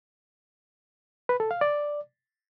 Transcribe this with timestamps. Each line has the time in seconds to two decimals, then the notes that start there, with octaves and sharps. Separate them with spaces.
1.29 B4
1.40 A4
1.51 F5
1.61 D5